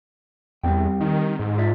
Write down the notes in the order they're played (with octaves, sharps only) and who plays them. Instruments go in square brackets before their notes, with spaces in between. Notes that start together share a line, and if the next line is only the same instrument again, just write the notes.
[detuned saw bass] E2 [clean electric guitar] G3 C4 G5
[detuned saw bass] D#3
G#2
[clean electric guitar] F4 D5 E5